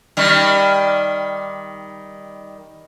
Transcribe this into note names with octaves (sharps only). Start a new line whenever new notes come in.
D#3 G3